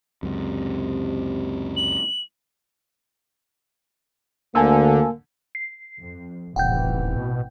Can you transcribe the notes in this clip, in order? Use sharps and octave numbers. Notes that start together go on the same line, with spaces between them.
C#2 F#2 C3
F#7
D2 D3 A#3 G#5 A5 E6
C7
F2
D#1 A1 C3 E3 F#5 G5 G6
B2